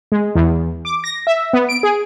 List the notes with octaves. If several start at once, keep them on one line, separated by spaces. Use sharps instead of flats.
G#3
E2
D6
A#6
E5
B3
D7
G#4